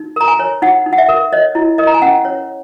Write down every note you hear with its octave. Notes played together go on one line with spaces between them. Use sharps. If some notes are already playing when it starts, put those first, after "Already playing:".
Already playing: D#4
A#4 A#5
G#5
C#5
D#4 F#5
D#4
F#5
E5
A#4
C#5 D#5
E4
A#4 D#5
A#5
G#5
C#4 F#5
C#5